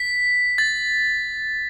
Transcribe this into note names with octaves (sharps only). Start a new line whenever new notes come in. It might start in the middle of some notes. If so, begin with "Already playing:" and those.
Already playing: B6
A6